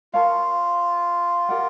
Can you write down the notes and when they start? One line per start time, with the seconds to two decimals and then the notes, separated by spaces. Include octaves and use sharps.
0.13 F4 A#4 C#5 F5 A5
1.49 G4 A#4 D5 F#5